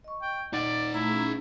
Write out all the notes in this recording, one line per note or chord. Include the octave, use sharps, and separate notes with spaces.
D#5 C#6
G5
D#4 D5 D#5 F#5
A3 E4 A#5
C#4 G#4